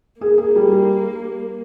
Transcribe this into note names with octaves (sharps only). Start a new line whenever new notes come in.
A#3 G#4
G#4
G3
G3